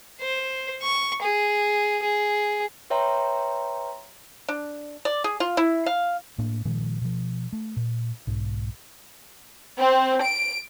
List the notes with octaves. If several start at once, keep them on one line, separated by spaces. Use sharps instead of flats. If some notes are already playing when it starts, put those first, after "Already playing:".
C5
C#6
G#4
G#4
B4 C#5 E5 G5 A#5 C6
D4
D5
G#4
F4
E4
F5
A2 A#3 D4
A#2 D#3 F3 G#3
B2 F3
A3
A#2
B1 G#2
C4
D7